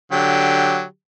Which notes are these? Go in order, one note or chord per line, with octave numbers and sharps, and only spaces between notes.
D3 F#3 G4